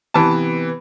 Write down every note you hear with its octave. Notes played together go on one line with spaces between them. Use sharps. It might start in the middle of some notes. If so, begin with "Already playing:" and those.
C3 E3 B3 A5